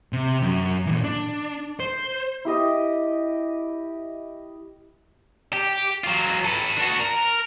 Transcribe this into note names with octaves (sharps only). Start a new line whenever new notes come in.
C3
F#2
A#2 E3
D4
C5
E4 G4 D#5
G4
F#3 F4
A4 B4
D4 F#4
A#4